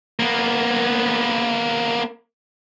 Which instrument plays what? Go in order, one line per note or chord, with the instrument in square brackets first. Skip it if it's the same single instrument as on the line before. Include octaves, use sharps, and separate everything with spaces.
[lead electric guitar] A#3 B3